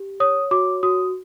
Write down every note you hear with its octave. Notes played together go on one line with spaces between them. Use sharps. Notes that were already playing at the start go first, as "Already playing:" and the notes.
Already playing: G4
C#5 D#6
F#4 D6
F#4 D#6